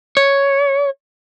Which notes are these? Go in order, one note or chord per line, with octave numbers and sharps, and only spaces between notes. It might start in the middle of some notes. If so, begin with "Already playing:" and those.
C#5